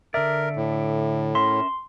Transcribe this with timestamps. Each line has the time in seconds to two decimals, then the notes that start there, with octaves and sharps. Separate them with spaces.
0.14 D3 A#4 D5 E5
0.56 A2
1.35 C#4 A#4 E5 C6